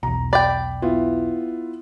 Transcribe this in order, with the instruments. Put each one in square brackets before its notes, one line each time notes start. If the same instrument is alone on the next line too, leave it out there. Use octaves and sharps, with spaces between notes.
[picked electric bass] B1 E2 [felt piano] A#5
[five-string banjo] D5 G5 [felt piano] B5
[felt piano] B3 E4 F4